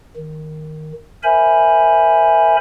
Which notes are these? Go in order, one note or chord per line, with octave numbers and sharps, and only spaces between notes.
D#3
A#4 C5 E5 G#5 B5